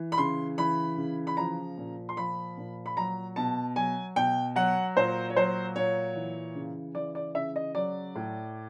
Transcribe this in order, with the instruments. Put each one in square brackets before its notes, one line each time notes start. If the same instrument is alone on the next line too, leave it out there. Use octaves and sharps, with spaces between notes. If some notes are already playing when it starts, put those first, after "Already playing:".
Already playing: [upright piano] E3
B5
C#3 C6
E3 B5
C#3
B5
F3 A#5
A#2
C6
F3 B5
A#2
B5
F#3 A#5
B2 A5
F#3 G#5
B2 G5
F#3 F#5
A#2 C5
C#5
F#3 C5
A#2 C#5
E3
C#3
E3 D5
D5
C#3 E5
D#5
F#3 D5
A2